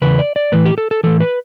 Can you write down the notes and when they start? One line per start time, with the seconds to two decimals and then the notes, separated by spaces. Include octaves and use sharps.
0.02 E2 C#3 B4
0.19 D5
0.36 D5
0.52 A2 E3 B4
0.66 G4
0.78 A4
0.91 A4
1.03 A2 E3 A4
1.20 B4